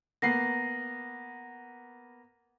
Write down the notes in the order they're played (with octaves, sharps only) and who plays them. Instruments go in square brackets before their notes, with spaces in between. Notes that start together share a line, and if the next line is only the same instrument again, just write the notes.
[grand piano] A#3 B3 C7 [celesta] A#6